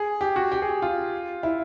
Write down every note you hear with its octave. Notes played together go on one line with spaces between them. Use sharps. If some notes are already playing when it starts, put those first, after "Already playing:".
Already playing: G#4
G4
F#4
G4
G#4
F4
E4